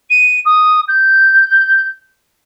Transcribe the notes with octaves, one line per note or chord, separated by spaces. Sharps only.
D#7
D#6
G6